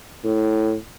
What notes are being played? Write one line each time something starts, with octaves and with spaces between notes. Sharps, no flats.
A2